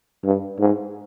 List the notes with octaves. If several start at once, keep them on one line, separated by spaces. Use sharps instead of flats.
G2
G#2